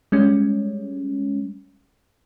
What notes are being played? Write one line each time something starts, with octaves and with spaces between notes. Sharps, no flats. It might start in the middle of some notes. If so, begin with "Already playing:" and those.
G3 G#3 C#4